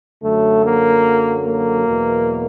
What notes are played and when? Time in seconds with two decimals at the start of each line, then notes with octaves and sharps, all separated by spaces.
0.23 F#2 D3 F#3 A3
0.64 A#3
1.45 A#3
1.86 E2 B2 F#3